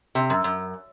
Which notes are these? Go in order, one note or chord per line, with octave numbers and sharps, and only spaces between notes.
C3
F#2
F#2